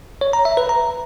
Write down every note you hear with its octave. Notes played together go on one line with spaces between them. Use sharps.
C#5
A#5
E5
B4
A#5